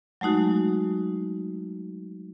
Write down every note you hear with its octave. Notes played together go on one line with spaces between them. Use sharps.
F#3 G#3 A3 D#4 F#4